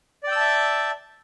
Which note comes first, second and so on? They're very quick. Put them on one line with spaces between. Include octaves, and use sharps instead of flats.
D5 G5 E6 A5 E5